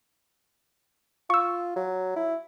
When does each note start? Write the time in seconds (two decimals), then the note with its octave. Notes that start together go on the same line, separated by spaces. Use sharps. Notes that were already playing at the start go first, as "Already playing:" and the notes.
1.30 F4 C#6 E6
1.76 F#3
2.16 E4